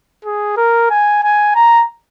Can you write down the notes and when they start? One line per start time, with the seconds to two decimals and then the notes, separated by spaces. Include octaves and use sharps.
0.25 G#4
0.57 A#4
0.90 G#5
1.23 G#5
1.55 A#5